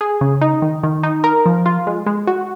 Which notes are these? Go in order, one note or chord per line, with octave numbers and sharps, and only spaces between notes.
G#4
C#3
D#4
D#3
D#3
D#4
A#4
F3
F4
G#3
G#3
F#4